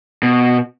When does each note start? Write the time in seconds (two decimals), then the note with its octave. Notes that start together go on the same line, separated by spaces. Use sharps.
0.23 B2